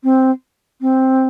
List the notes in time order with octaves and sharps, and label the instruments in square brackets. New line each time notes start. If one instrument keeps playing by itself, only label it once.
[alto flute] C4
C4